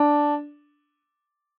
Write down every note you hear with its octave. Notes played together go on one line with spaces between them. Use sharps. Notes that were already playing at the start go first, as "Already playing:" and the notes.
Already playing: D4